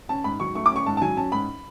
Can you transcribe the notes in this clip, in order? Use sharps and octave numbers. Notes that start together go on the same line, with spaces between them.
C#4 A5
G#2 B5
F#3 C#6
A3 C#6
D6
C#4 C#6
G#2 A5
A5
F#3 G#5
C#4 A5
G#2 B5